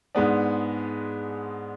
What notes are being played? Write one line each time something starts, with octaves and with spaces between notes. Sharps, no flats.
G#2 G#3 B3 D4